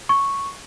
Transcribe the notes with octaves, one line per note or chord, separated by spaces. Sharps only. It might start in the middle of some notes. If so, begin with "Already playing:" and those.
C#6